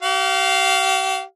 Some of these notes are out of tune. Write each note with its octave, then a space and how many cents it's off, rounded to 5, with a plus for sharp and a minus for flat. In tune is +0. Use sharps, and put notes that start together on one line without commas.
G4 -45 F5 +0